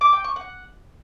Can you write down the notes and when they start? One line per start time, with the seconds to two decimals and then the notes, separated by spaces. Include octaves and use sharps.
0.01 D6
0.13 G5
0.24 C#6
0.36 F#5